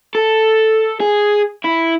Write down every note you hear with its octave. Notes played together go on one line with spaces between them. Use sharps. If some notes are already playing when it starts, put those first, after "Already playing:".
A4
G#4
E4